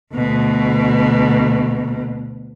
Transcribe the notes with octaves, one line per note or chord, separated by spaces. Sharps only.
D2 B2